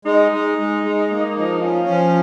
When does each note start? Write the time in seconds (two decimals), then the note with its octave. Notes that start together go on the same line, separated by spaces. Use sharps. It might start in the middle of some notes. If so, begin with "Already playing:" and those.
0.05 G#3 D#4
0.32 G#3
0.58 G#3
0.83 G#3
1.10 A#3
1.36 F3
1.61 C#4 F4
1.88 F3